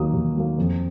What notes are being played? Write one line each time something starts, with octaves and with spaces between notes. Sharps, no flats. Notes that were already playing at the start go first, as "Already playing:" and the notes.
Already playing: D#2 D#3 F#3 A#3 D#6
D#2
D#3 F#3 A#3
F2